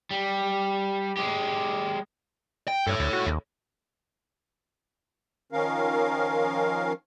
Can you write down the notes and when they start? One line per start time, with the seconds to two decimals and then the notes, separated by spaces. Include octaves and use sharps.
0.11 G3
1.17 G#3 G4
2.68 G5
2.87 G2 A4 C#5
3.00 D2
3.13 F#4
3.26 D#2
5.52 D#3 F3 C#4 A#4 F5